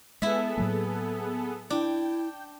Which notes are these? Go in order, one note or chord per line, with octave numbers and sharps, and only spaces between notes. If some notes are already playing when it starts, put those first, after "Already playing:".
G#3 B3 E4 G#4 A4 E5
A2 F#3 A#3
D4 E4 G5